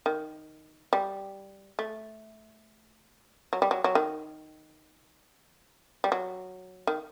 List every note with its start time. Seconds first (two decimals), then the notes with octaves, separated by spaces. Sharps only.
0.06 D#3
0.93 G3
1.79 A3
3.53 F#3
3.62 G3
3.71 F#3
3.84 F#3
3.95 D#3
6.04 G3
6.12 F#3
6.87 D#3